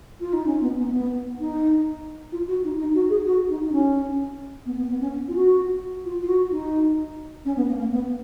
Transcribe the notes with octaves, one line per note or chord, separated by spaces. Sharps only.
F4
D#4
C#4
B3
B3
A#3
B3
D#4
F4
F#4
D#4
D#4
F#4
G#4
F#4
D#4
D#4
C#4
B3
B3
B3
C#4
F4
F#4
F4
F4
F#4
D#4
C#4
B3
A#3
A#3
B3